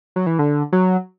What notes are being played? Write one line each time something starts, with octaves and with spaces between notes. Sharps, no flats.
F#3
E3
D3
F#3